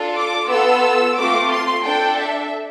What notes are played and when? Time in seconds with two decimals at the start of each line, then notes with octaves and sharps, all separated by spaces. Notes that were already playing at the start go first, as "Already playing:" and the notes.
Already playing: D4 F4 A4
0.16 D6
0.49 B3 F4 A4 E6
1.17 A3 C4 F4 D6
1.50 C6
1.83 D4 A4 G5
2.18 E5